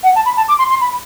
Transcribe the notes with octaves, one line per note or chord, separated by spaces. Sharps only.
F#5
A5
B5
A5
D6
C6
C6
B5